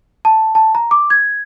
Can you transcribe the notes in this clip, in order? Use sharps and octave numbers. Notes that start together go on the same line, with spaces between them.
A5
A5
A#5
D6
G#6